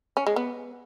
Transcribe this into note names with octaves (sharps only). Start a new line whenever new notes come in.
C#4
G#3
B3